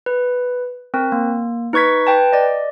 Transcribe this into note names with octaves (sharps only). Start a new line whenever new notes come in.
B4
C4 A#4
A#3
D#4 B4 C#6 G#6 B6
B4 G5 A5
D5 D#5